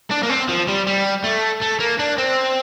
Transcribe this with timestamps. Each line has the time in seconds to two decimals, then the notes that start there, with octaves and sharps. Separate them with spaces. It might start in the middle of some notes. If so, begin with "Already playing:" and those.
0.11 D4
0.23 A#3
0.30 C4
0.49 F3
0.68 G3
0.87 G3
1.24 A3
1.61 A3
1.80 A#3
1.99 D4
2.18 C4